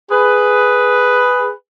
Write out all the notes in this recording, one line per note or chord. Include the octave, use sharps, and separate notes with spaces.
G#4 B4